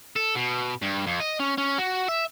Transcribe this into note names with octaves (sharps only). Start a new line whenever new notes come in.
A4
B2
G2
F2
D#5
C#4
C#4
F#4
E5